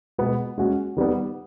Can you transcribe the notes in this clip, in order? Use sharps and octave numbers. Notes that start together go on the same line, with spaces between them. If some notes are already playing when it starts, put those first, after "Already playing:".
B2 G#3 B3
G#3 C#4 F#4
D#3 G3 B3